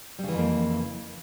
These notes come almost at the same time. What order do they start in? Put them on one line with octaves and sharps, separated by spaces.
G3 C#3 E3 F2 A#3